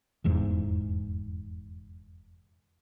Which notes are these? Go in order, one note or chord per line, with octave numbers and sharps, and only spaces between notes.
F1 E2 G#2